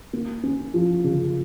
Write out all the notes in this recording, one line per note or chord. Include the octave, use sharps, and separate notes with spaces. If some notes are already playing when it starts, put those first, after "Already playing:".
A#3
C#4
F3
C#3